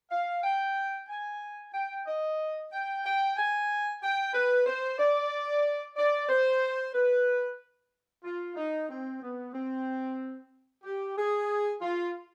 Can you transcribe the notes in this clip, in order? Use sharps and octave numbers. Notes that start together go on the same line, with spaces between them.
F5
G5
G#5
G5
D#5
G5
G5
G#5
G5
B4
C5
D5
D5
C5
B4
F4
D#4
C4
B3
C4
G4
G#4
F4